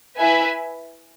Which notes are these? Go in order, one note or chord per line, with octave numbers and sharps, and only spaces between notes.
E4 B4 E5 G#5